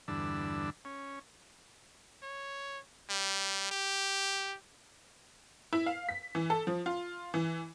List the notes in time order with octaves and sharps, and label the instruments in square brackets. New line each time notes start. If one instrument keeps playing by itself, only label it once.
[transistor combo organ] E2 G2 D3 D4 E6
C#4
[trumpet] C#5
G3
G4
[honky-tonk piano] E4
F5
B6
E3
A4
F3
F4
E3